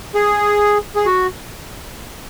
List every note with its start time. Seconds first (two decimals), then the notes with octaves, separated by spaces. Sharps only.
0.15 G#4
0.96 G#4
1.06 F#4